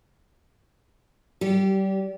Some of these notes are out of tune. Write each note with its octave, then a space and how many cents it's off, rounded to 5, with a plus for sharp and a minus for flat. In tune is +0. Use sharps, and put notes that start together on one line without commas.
G3 -30 G4 -15